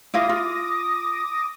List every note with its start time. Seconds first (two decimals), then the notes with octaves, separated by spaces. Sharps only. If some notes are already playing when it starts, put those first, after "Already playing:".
0.14 E4 F4 F5 D6 D#6 A#6
0.29 F4